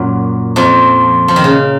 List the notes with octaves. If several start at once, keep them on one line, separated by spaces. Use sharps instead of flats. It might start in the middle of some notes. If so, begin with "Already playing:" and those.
Already playing: F#2 A#2 F#3 A#3
F2 F3
F3
D#3
C#3